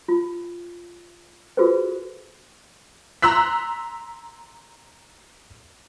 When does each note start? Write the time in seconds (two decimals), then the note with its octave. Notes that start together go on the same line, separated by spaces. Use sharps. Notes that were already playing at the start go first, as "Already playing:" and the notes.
0.08 F4
1.57 F4 F#4 G#4 A4 B4 C5
3.22 A#5 C6 E6 F#6 B6